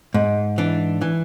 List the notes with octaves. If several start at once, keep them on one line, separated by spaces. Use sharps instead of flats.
G#2
E3 D4
E3